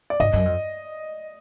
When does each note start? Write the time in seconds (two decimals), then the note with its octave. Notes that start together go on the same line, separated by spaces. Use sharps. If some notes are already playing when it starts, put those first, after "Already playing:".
0.10 D5
0.20 G#2 D#5
0.33 F#2
0.45 F2